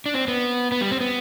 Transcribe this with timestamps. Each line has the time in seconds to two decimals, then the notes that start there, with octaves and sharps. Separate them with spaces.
0.06 D4
0.14 C4
0.28 B3
0.72 B3
0.81 G3
0.91 C4
1.01 B3